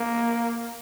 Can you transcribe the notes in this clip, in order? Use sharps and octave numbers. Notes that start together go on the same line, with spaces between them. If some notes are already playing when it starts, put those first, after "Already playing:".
Already playing: A#3